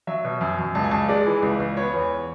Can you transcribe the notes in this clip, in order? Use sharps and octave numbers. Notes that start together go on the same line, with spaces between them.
F#3 E5
B2
F#2
F#2
C#2 A5
G#5
C#2 A5
G#3 D5
E3
C#2
C#2
B3 C#5
E2